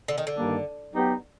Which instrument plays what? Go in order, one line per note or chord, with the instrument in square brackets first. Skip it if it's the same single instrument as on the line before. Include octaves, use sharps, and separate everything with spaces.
[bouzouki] D3
D#3
D3
[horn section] G2 D#3 G3 A#3 D4
F#3 B3 D#4 G4